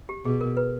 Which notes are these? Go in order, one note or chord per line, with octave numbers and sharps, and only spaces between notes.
G4
B2 G#4
A#4
B4